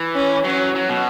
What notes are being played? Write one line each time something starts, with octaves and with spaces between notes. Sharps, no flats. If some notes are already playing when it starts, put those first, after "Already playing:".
Already playing: E3
C#4
F#3 C#4
F#3
B2